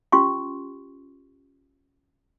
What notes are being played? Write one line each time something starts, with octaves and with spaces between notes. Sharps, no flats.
C#4 F4 G4 C6 C#6